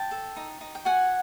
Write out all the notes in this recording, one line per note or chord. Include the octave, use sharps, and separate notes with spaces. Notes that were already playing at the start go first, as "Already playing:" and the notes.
Already playing: G5 A5
A4
D#4
D#4
G5
F#4 F#5 G#5